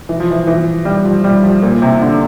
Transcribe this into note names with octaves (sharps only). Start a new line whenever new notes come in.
E3
F3
E3
E3
G3
F3
G3
F3
A#2
C3
D3